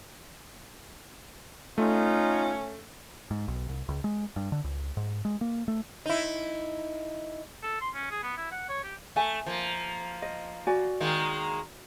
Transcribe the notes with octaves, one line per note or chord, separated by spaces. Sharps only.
A3 C#4 D#4 F4
G#2
B1
C2
C#2
G#3
G2
D3
C#2
G#2
G#3
A#3
A3
D#4 E4
A4
C6
C#4
G#4
B3
E4
F#5
C#5
G4
A3 E5 G#5
F3 A#3
D#5
F#4 D5 G#5
D#3 G#3 A#3